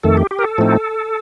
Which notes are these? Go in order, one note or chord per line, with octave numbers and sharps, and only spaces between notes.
F2 D#3 A3 A4
G4
G4
A#4
A4
A2 F3 A3 C4 D#4